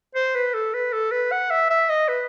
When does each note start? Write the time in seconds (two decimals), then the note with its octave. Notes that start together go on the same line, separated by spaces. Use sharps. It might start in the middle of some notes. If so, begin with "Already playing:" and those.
0.15 C5
0.35 B4
0.54 A4
0.74 B4
0.93 A4
1.12 B4
1.32 F#5
1.51 E5
1.70 E5
1.89 D#5
2.09 B4